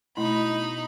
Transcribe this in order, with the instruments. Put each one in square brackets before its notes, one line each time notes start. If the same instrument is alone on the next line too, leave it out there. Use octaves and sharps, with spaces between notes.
[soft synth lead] B2 [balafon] A3 E4 [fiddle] D#4 B5 [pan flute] D#5